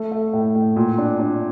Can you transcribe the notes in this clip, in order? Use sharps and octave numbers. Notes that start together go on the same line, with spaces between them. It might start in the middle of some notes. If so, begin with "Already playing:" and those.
Already playing: A3
A3
A2
A2
A#2
D4
D4